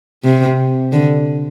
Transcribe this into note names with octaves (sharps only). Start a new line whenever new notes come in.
C3
D3